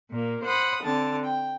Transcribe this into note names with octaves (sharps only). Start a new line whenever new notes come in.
A#2 A#3
C5 F#5 B5 D#6
D3 C4 A5
G5